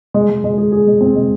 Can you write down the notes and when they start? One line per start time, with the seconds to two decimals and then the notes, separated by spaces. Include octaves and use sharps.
0.14 G#3
0.30 G#3
0.44 G#3
0.58 G#4
0.72 G#4
0.87 G#3
1.01 C4
1.15 G#3